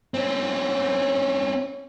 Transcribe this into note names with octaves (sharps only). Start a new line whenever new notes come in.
C4 C#4